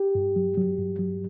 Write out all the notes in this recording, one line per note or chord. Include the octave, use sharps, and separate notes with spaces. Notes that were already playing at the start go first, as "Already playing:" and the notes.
Already playing: G4
G2
F#3
F#3
G2
F#3